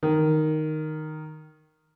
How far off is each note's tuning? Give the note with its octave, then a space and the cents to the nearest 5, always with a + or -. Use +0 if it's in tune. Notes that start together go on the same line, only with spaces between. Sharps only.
D#3 -5